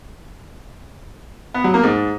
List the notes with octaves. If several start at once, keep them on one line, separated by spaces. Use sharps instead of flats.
B3
F#3
A#3
G#2